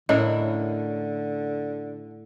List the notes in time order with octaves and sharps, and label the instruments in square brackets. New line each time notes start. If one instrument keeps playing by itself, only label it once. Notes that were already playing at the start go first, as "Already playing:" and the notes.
[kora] A2 [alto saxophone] D3 [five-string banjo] C#4 E4 A#4 [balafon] D#5